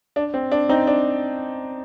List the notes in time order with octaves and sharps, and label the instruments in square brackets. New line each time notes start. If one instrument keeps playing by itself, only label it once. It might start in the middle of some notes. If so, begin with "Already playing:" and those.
[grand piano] D4
C4
D4
C4 D#4
D4